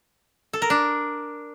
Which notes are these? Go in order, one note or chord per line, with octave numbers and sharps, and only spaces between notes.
A4
A#4
D4